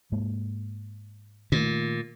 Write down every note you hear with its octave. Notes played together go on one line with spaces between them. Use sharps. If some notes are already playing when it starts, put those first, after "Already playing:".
G#2 G#3 A#3
A#2 D#3 A3